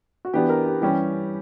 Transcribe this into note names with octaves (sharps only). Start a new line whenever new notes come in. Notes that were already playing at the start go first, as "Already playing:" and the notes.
F#4
E3 B3 D4 G4
A#4
G4
E3 G3 C#4 G4